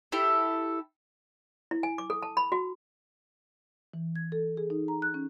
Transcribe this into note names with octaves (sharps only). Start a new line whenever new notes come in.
E4 G4 A4
E4
G#5
D6
A4
A5
B5
F#4
E3
G#6
A4
G#4
D#4
A#5
F#6
C#4